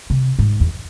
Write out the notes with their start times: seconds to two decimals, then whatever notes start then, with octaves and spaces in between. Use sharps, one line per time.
0.10 C3
0.39 G#2
0.60 E2